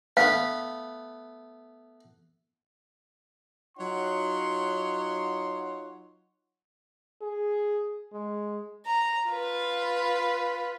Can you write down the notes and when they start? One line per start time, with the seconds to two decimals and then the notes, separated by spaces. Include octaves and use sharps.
0.17 A3 B3 F5
3.78 F#3 D#4 F4 C#5 F#5 C6
7.22 G#4
8.13 G#3
8.86 A#5
9.29 F4 B4